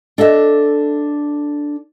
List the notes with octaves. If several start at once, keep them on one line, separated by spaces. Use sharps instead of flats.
D4 A4 D#5 E5